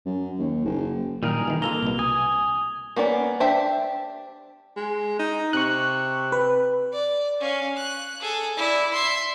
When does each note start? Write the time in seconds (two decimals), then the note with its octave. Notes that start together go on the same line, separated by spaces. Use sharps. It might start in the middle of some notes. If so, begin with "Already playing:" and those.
0.05 F#2
0.39 D#2
0.65 F#1
1.23 A#2 D#3 G3 G#4 A#4 F5
1.48 D#3 E3
1.62 A#3 F4 A4 A#5 F7 G7
1.83 C2 B2
1.99 G#5 D#6
2.96 A#3 B3 C#4 D5
3.40 D4 G4 C5 E5 A5
4.76 G#3
5.19 D#4
5.53 C3 C#6 F#6
6.32 B4
6.93 D5
7.40 C#4 F5
7.77 F#6
8.21 G#4 A4
8.57 E4 D5
8.93 E5 C6